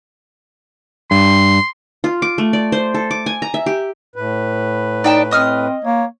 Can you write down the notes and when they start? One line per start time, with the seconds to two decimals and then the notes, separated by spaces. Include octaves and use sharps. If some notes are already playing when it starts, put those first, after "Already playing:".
1.11 G2 C6
2.04 F4
2.22 D6
2.38 A3
2.53 D5
2.72 C5
2.94 A4
3.11 D6
3.26 G#5
3.42 A#5
3.54 E5
3.66 G4
4.16 A2 B4
5.04 D#4 D5 G5 A5
5.31 C4 D#5 D#6 F6
5.84 A#3 C#5